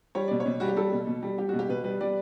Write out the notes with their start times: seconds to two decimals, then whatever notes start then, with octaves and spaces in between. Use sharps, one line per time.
0.15 G3 C#5
0.28 B2 D5
0.40 C#5
0.46 B2
0.60 G3 F#4
0.68 G4
0.76 G3 A4
0.92 B2
1.07 B2
1.23 G3
1.38 G3 G4
1.49 B2 F#4
1.59 G4
1.69 B2 B4
1.84 G3 B4
2.01 G3 D5